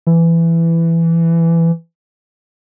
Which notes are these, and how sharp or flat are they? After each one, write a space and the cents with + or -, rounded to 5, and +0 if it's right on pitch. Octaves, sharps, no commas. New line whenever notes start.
E3 +15